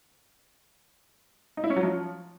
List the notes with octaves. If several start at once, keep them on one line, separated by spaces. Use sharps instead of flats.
D#4
E4
C#4
F#3
F3